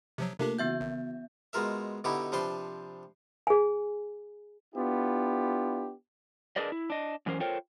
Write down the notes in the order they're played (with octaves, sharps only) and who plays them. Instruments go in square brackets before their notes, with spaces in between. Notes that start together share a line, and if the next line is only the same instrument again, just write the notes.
[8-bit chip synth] C3 F3 F#3
[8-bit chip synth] C3 D4 G4 [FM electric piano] A3 A#3 F4
[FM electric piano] C#3 E3 F#4 [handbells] B3 E5 G6
[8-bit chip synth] G#1
[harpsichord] B2 G#3 F4 A#4 E5
B2 D3 D#4 E4 F#4 G4
C3 F3 D4 B4 C5 C6
[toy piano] G#4 G#5
[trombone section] B3 D4 E4 F4 G4
[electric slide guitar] D4 G#4 A#4 B4 D5 D#5
E4
D4 D#5
F#2 E3 C#4 A#4 C5
F4 A4 A#4 C5 C#5 G5